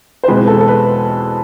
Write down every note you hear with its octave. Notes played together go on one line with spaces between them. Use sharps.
C5
E2 B2 G#3 C4 B4
A4
A4
B4